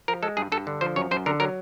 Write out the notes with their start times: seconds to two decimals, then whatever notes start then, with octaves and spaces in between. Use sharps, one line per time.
0.08 F3 A#4
0.23 G#3 A4
0.37 G2 G#4
0.52 G2 A4
0.67 D3
0.81 F3 C5
0.96 F#2 C#5
1.11 F#2 C5
1.26 D3 A#4
1.40 F#3 A#4